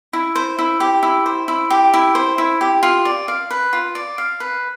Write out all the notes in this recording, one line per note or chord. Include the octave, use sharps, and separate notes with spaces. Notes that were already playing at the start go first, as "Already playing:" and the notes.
E4
C5
E4
G4
E4
C5
E4
G4
E4
C5
E4
G4
F4
D5
F5
B4
F4
D5
F5
B4